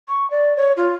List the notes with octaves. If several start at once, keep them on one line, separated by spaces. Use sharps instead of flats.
C#6
D5
C#5
F4